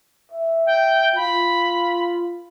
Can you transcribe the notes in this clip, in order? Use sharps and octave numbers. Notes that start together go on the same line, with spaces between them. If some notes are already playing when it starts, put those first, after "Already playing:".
E5
G5
F4 B5